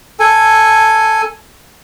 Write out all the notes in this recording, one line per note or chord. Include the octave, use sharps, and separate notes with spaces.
A4 G#5